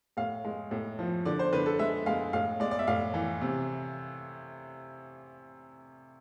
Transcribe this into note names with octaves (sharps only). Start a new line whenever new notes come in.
A2 F5
G#3
A2
F3
D3 D5
C5
D3 B4
A4
G#3 E5
G#3 F5
A2 F5
G#3 D5
D5
E5
A2 F5
E3
C3